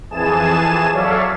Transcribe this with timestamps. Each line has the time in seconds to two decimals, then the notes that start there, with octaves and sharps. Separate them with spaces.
0.10 F2 E3 G#4 G#5 A5 E7
0.92 F#3 A4 C#5 D5 E5 F5